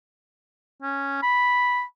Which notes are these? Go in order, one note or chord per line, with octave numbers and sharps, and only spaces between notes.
C#4
B5